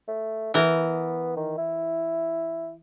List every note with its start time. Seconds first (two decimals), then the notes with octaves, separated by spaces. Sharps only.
0.08 A3
0.54 E3 B3 A#4
1.37 D#3
1.58 E4